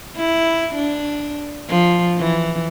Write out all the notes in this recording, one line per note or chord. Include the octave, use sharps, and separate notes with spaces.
E4
D4
F3
E3